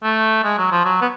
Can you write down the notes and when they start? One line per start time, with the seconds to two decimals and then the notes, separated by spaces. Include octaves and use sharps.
0.03 A3
0.44 G#3
0.58 F#3
0.72 F3
0.85 F#3
1.01 B3